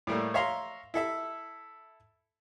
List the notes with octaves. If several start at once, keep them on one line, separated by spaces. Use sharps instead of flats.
A2 G3 A3 A#3
C#5 E5 F5 A#5 C6
E4 A4 E5